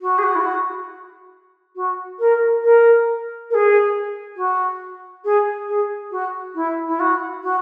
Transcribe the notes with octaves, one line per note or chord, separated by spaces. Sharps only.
F#4
G#4
F#4
E4
F#4
F#4
A#4
A#4
A#4
G#4
F#4
G#4
G#4
F#4
E4
E4
F#4
F#4